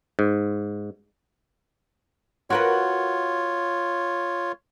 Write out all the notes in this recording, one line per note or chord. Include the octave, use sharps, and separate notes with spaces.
G#2
F4 F#4 A#4 B4 C#5